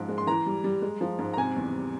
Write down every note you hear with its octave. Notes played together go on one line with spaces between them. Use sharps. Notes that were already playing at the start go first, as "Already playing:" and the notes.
Already playing: G#2 F3
G#3
C6
E3 A#5
G3
G3
G#3
F3
G#2
A#5
C3 G#5
E2
G3